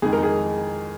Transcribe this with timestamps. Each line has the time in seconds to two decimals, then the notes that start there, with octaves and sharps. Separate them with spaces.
0.02 F2 D#3 G#3 G#4
0.13 A#4
0.23 G#4